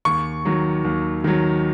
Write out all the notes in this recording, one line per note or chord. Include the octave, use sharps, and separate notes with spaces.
D#2 C#6
D#3 F#3
D#2
D#3 F#3